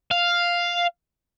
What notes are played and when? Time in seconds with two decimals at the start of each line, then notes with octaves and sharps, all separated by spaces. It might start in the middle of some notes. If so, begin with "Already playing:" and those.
0.11 F5